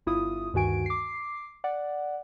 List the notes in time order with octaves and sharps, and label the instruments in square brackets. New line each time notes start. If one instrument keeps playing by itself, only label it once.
[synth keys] G1 E4 F4 D#6
D2 G2 D#3 F#4 G#5 D7
D6 C7
D5 F#5